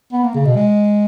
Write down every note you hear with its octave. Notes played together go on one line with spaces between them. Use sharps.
B3
A#3
C#3
B2
G#3